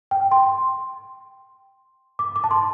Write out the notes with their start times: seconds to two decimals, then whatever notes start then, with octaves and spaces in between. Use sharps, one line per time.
0.11 G5
0.32 C6
2.19 D6
2.36 D6
2.44 A5
2.51 C6